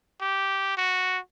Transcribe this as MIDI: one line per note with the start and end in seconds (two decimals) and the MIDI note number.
0.21 0.76 67
0.77 1.19 66